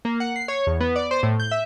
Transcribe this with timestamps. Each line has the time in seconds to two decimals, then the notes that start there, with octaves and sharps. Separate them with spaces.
0.05 A#3
0.20 F#5
0.36 C7
0.48 C#5
0.67 E2
0.81 B3
0.96 D5
1.11 C5
1.23 A2
1.40 G6
1.51 E5